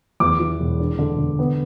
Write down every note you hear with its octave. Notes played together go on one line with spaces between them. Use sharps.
E2 D6
E3
E1
D4
D3
D3
B3